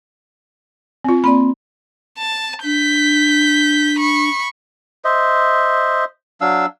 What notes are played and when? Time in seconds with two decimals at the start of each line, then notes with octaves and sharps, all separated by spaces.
1.04 C4 F4
1.24 A#3 C4 D5 B5
2.18 A5
2.64 D4 G6 B6
3.99 B5 C#6
5.05 C5 D#5 E5
6.41 F#3 D4 F5 E6